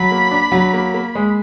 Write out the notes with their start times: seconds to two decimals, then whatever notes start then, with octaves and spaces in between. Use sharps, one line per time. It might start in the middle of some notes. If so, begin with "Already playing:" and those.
Already playing: F#3 B5
0.11 A#3
0.31 D4
0.52 F#3
0.73 A#3
0.94 A#3
1.15 G#3